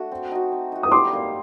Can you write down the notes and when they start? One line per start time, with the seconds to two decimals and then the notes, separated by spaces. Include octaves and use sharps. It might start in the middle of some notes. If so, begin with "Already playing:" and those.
Already playing: A3 D4 F#4
0.11 C4
0.31 D#4 F#4
0.52 C4
0.72 D#4 F#4
0.83 D#6
0.91 G3 C6 D6
1.13 A#3 D#4